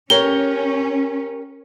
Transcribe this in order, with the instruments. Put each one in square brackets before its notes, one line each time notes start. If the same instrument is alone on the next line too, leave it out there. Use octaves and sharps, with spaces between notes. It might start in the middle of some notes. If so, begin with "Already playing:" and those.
[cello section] C#4 [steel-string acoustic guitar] G4 A#4 C#5 [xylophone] G7